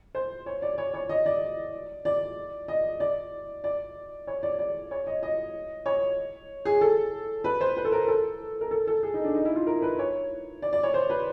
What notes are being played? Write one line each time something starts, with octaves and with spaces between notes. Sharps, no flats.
C5
C#5
D5
C#5
C#5
D#5
D5
D5
D#5
D5
D5
C#5
D5
D5
C#5
D#5
D#5
C#5
G#4
A4
B4
C5
B4
A4
A#4
A4
A#4
A4
A4
G#4
D#4
D4
D#4
E4
F4
A#4
B4
C#5
D5
D5
C#5
C5
B4